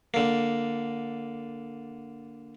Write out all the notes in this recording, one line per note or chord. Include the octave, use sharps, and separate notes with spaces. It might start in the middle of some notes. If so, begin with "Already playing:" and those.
D3 A#3